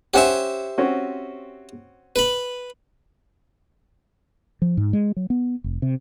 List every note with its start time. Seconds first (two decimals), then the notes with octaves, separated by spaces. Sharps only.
0.14 C#4 G4 C5 E5 F#5 G#5
0.78 C4 C#4 F#4
2.16 B4 B5
4.62 F3
4.77 G#2
4.93 G#3
5.17 F#3
5.30 B3
5.64 F1
5.82 C3